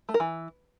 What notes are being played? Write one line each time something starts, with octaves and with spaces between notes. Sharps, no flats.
A3
A#4
E3